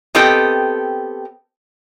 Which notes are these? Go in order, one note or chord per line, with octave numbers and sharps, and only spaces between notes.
B3 C4 G4 A4 D#5 G5